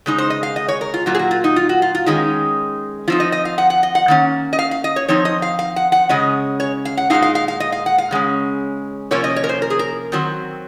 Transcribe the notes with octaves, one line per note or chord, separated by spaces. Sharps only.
C#3 G#3 D#4
C5
D#5
F5
D#5
C#5
A#4
F4
A#2 F#3 A#3 F4
G#4
F#4
F4
D#4
F4
F#4
F4
F4
D#3 G#3 C#4 D#4
F3 C4 D#4 F4
D#5
D#5
F5
F#5
F#5
D#5
F#5
D#3 A#3 C#4
D#5
F5
F5
D#5
C#5
F3 C4 D#4 C#5
D#5
F5
F5
F#5
F#5
C#3 G#3 C#4 D#5
C#5
F5
F#5
A#2 G#3 C4 D#4 F5
F5
F5
F5
D#5
F5
F#5
F5
C#3 G#3 C#4
C3 F3 A#3 C#4 C#5
D#5
C#5
A#4
C5
A#4
G#4
A#4
D#3 F#3 C4